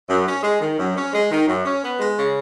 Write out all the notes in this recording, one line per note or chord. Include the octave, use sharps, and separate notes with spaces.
F#2
C#4
G#3
D#3
F#2
C#4
G#3
D#3
F#2
C#4
B3
G#3
C#3